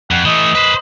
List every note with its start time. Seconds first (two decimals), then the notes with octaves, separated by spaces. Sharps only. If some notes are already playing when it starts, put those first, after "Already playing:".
0.11 F2 F#5
0.25 E3 A3 D#5
0.55 B4 C5